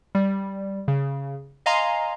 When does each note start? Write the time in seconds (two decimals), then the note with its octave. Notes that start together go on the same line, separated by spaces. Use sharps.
0.15 G3
0.88 C#3
1.66 D#5 F5 G#5 A#5 C6